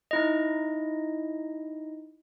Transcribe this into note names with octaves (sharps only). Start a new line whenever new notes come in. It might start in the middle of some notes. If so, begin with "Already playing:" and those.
D#4 E4 D#5